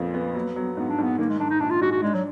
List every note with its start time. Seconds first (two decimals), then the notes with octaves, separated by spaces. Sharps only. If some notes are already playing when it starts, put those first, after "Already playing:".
Already playing: F2 A#2 F3 B3
0.14 B3
0.35 F#3 A#3
0.56 F#3 B3
0.77 G#2 B3
0.90 D4
0.98 G#2 B3
1.18 D#3 A#3
1.29 G#3
1.40 G#2 D4
1.50 D#4
1.60 A#1 D4
1.70 F4
1.81 G#2 F#4
1.91 F#4
2.02 G#3 D4
2.14 F#3